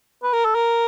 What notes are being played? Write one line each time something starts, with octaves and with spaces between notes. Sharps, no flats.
B4
A#4
A4
A#4